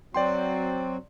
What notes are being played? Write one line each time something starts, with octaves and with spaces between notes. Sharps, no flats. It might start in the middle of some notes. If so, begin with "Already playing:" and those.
F#3 C4 F#4 D5 G5 C6